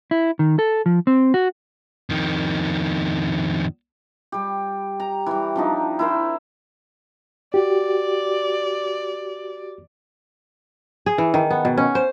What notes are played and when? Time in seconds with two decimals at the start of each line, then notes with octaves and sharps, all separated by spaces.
0.11 E4
0.39 D#3
0.59 A4
0.86 F3
1.07 C4
1.34 F#4
2.10 F2 D#3
4.32 G3 G4
5.00 A#5
5.26 E3 G3
5.56 F3 D4 D#4
5.99 E4 A#4 C5
7.54 F#4 G4 D5
11.06 G#4
11.18 E3
11.34 D#3
11.50 B3
11.65 B2
11.77 C#4
11.95 C5